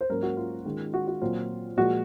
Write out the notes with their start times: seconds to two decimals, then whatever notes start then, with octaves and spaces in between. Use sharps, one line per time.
0.01 C5
0.10 G#2 F#3 A#3 C#4 A#4
0.23 F#4
0.37 F4
0.65 D#3 G#3 C#4
0.94 F#4
1.08 F#4
1.22 A#2 F#3 C4 F4
1.77 A#2 F3 G#3 F#4